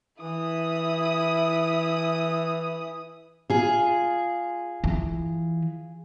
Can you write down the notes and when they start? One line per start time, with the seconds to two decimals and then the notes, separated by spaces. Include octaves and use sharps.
0.22 E3 E4 D#6
3.50 F4 G#4
4.84 E3